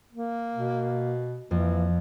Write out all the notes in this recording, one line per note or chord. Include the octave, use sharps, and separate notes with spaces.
A#3
B2
F2 E3 A#3